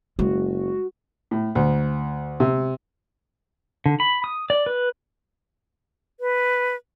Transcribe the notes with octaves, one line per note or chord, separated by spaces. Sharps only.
F#1 G#3 F#4
A2
D2
C3
D3
B5
D#6
D5
B4
B4